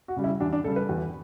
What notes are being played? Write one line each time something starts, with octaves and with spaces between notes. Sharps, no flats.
F#4
C#3 G3
E4
E2 D4
D4
C#3 G3 A4
B4
E2